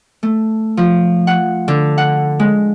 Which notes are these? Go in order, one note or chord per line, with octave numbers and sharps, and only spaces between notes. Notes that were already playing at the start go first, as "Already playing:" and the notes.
A3
F3
F#5
D3
F#5
G#3